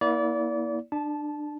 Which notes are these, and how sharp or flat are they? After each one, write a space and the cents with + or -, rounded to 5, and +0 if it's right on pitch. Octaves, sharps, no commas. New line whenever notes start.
A#3 +30 E4 -25 D5 -30
D4 +25 A5 -15